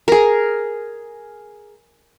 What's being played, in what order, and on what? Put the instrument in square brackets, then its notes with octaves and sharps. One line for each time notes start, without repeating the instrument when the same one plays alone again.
[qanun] G#4 A#4